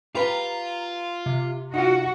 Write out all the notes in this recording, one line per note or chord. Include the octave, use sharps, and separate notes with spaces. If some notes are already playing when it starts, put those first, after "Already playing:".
F4 G4 B4 A#5
C3
D#4 F4 F#4